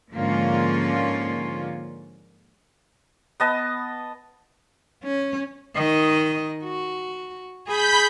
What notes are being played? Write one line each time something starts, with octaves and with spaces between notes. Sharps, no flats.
G#2 D3 F3 A#3 C#4 F4
B3 D#5 A5
C#4
D#3 D#5
F#4
G#4 B5 G6 B6